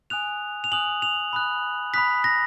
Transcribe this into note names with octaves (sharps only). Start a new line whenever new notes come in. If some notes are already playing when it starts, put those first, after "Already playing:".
G#5 D#6 F#6 F7
F7
G#5 D#6 F#6 F#7
F7
B5 D#6 F#6
B5 D#6 F#6 B6
A#6